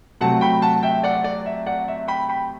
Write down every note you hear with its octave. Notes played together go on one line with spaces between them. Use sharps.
C3 F#3 A3 F#5 A5
G5 B5
F#5 A5
E5 G5
D5 F#5
D5
E5
D5 F#5
E5
G5 B5
G5 B5